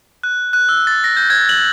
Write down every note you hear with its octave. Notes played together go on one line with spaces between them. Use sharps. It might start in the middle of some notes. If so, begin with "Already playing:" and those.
F#6
F#6
E6
A6
A#6
G6
G#6
F#7